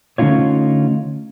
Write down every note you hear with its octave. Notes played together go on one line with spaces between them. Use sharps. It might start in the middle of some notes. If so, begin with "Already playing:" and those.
D3 A3 C#4 D#4 F4 C#5